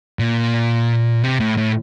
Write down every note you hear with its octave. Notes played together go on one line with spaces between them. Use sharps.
A#2
C3
A2
A2